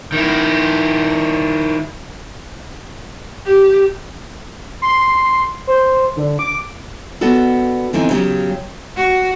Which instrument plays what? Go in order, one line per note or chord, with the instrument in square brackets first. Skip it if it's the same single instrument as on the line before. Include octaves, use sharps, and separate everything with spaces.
[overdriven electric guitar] D#3 E4
[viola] G4
[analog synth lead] C6
C5
D3
D6
[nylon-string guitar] B3 D4 F#4 A4
D3 E3 C4 D#4
C#3 F#3 C#4 G4
[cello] F#4